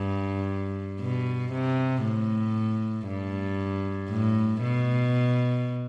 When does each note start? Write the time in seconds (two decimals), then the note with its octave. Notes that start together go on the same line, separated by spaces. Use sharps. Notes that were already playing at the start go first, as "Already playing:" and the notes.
Already playing: G2
1.01 B2
1.53 C3
2.04 A2
3.07 G2
4.10 A2
4.62 B2